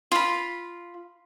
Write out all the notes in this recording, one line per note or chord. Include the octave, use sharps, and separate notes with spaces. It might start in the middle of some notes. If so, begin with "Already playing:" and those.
F4 B5